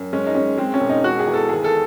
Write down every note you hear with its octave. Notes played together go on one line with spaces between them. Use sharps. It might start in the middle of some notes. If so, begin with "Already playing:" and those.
Already playing: F#2
G#3 C#4
D#4
G#3 C#4
G#3 C4
C#4
E1
D#4
G#3 F#4
G#4
E2
A4
D#2 G#4
A4